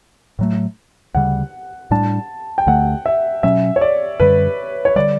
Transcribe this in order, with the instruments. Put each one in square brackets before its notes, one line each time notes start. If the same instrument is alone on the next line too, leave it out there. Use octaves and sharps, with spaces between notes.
[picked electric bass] A2 F#3 A3
[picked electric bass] D2 C#3 G3 [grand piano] F#5
[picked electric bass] A2 G3 D4 [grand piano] A5
[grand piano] G5
[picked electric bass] D2 D3 A3 [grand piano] F#5
[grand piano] E5
[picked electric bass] B2 F#3 C#4 [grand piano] E5
[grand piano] C#5
D5
[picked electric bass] F#2 D3 G3 [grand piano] B4
[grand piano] C#5
[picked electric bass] D3 G3 [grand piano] D5